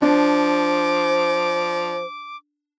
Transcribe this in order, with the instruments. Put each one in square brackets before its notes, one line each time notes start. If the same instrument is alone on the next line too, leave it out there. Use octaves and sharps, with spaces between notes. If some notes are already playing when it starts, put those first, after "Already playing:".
[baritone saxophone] F3 [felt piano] D4 [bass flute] C5 [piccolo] D6